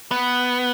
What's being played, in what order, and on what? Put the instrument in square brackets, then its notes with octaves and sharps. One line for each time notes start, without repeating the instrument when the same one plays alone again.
[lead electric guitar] B3